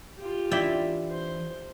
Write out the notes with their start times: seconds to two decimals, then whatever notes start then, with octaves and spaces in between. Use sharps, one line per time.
0.18 F4 G4
0.51 E3 D4 E4 D5 E5 G5
1.11 C5